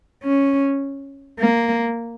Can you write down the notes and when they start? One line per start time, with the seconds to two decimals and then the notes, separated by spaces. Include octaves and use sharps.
0.24 C#4
1.40 A#3